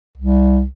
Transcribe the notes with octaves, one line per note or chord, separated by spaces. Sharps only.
C2